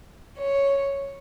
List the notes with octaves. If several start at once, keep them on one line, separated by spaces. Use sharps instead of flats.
C#5